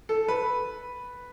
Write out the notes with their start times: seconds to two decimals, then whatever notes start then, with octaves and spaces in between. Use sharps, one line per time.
0.09 A4
0.28 B4